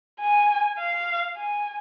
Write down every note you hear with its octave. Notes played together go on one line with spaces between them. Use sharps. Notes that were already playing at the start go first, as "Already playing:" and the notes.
G#5
F5
G#5